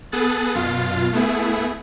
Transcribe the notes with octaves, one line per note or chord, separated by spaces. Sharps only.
B3 G#4 A4 D#6 F#6 A6
F#2 B2 F4 F5 A6
A3 B3 E4 G#4